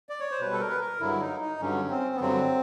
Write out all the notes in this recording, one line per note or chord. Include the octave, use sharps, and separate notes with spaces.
D5
C#5
C5
B2 G3 B4
A4
A#4
B4
A#4
G2 D3 F#3 E4
D#4
D#4
G2 D3 F#3 C#4
C4
B3
G2 D3 F#3 C4